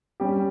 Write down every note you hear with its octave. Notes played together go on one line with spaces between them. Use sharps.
G3 C#4 G4